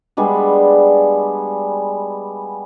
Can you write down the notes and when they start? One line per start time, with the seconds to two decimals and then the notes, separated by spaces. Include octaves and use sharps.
0.17 G3 G#3 B3 D4